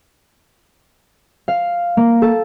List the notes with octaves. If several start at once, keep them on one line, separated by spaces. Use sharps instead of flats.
F5
A#3
A4